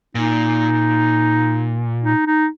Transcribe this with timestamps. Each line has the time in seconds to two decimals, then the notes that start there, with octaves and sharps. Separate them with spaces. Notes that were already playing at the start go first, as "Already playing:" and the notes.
0.15 A#2 D#4
2.03 D#4
2.26 D#4